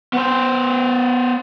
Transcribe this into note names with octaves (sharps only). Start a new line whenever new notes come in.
B3 C5